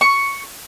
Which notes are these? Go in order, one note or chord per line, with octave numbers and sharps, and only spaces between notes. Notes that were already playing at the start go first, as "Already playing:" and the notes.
C#6